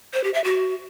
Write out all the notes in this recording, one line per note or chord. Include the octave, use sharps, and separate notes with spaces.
C5
G4
E5
F#4